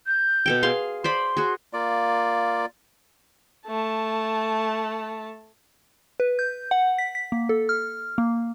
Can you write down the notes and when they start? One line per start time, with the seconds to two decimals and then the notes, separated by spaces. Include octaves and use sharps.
0.07 G6
0.46 B2 A4 G5
0.63 G#4 F5 C6
1.04 C5 D5 B5 C6
1.37 F#4 G#4
1.73 A#3 F4 D5
3.67 A3 A5
6.20 B4
6.39 G6
6.71 F#5
6.99 B6
7.15 B6
7.32 A#3
7.49 A4
7.69 F6
8.18 A#3